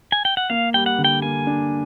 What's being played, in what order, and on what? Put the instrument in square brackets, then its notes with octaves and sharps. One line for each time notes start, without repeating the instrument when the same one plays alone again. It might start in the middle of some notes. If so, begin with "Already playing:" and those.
[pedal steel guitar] G#5
G5
F#5
[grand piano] A#3 [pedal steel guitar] F5
[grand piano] G3 [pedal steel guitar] G5
[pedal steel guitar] F#5
[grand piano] D3
[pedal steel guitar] G5
[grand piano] A#3 [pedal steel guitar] G#5
[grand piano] D4